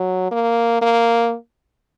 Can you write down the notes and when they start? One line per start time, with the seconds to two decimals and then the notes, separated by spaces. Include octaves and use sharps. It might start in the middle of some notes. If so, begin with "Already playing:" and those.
Already playing: F#3
0.31 A#3
0.82 A#3